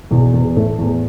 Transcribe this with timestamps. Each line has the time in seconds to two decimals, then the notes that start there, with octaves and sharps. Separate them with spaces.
0.11 E2 B2
0.34 E2
0.57 A2 A3
0.79 E2